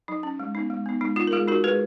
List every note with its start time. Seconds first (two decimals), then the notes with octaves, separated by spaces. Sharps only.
0.08 F#3 D#4
0.23 C#4
0.39 G#3
0.55 B3 D#4
0.70 G#3
0.86 B3 D#4
1.01 G#3 D#4
1.16 D#4 F4
1.27 A#4
1.32 G#3 F4 G#4
1.48 D#4 F#4 A#4
1.64 G#3 G#4 B4